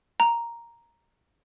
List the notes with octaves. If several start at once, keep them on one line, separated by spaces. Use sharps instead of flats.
A#5